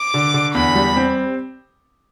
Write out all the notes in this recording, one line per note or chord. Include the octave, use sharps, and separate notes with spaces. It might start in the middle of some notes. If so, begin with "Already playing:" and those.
Already playing: D6
D3
D3
E2 B5
G3
C4